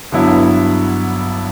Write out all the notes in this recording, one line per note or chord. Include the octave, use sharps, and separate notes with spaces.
G2 D3 F#3 B3 E4